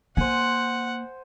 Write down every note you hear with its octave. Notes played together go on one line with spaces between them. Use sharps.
A#3 C5 F#5 G#5